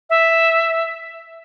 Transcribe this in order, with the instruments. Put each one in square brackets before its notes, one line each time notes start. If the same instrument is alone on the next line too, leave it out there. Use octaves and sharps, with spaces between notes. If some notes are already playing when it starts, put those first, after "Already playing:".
[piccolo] E5